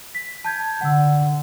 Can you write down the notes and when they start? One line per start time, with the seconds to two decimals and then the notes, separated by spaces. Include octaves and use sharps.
0.15 B6
0.45 A5 G6 G#6
0.81 D3 F#5 E6